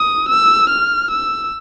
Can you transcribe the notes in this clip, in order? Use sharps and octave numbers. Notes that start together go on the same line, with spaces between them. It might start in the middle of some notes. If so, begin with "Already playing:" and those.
Already playing: D#6
E6
F6
E6